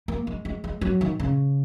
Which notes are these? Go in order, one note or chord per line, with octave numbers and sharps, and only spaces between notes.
A#3
G#3
G#3
G#3
F#3
D#3
C#3